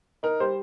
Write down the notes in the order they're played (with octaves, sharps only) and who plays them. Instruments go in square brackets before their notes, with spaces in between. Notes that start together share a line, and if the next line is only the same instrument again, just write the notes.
[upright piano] D#4 A#4
G3 C5